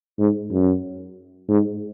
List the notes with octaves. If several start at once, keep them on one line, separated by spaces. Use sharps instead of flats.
G#2
F#2
G#2